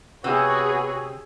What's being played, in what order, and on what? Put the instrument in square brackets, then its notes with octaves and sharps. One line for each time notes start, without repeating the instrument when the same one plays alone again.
[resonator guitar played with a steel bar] C3 [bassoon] B3 [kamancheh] F#4 C#5 [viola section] G#4